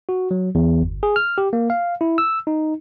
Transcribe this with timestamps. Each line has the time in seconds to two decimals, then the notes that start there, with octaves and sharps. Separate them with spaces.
0.09 F#4
0.31 F#3
0.55 E2
0.81 G1
1.03 G#4
1.16 F6
1.38 G4
1.53 A#3
1.70 F5
2.01 E4
2.18 E6
2.47 D#4